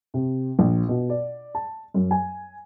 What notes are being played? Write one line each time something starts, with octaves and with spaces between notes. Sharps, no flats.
C3
A#1
B2
D5
A5
F#2
G#5